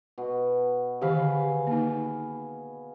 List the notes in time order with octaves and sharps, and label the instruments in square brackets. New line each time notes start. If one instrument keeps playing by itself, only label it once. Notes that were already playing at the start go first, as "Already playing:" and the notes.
[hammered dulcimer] B2
[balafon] D3 D#3 G4 [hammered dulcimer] G#4 F5 B5
[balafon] A#3 D#4